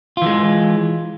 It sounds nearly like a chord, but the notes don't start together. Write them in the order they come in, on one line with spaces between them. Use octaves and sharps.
F4 E3 G#3